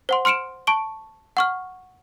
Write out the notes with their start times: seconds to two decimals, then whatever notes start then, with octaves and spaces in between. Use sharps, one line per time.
0.09 C5 F#5 C6
0.25 C6 F6 C#7 D7 E7
0.67 A5 C#6 D7 G7
1.37 F#5 C#6 F6